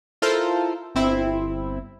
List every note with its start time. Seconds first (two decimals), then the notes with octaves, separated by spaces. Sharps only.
0.22 E4 F4 A4 A#4 C5
0.95 G1 C4 E4